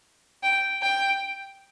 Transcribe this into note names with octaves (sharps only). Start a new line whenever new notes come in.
G5
G5